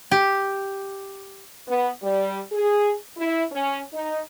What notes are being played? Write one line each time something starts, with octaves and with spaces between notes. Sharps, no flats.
G4
B3
G3
G#4
E4
C#4
D#4